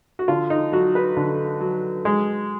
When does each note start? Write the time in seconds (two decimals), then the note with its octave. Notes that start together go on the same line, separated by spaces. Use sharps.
0.19 F#4
0.28 D3 F4
0.50 D#4
0.72 F#3 F#4
0.95 B4
1.17 D3
1.61 F#3
2.05 G#3